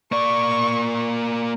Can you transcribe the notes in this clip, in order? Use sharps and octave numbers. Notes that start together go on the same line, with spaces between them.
A#3 D5 C#6